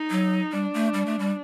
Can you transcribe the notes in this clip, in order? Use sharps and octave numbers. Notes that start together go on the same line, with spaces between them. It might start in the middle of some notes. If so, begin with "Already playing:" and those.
Already playing: D#4
F#3
G3 D4
A3
G3
A3
G3